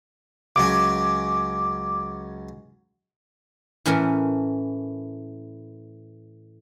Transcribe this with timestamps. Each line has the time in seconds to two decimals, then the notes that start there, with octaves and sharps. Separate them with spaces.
0.56 C#2 F#3 C#4 D6
3.86 A2 E3 C#4 A#4 A5